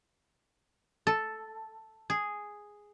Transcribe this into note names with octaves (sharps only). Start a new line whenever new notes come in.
A4
G#4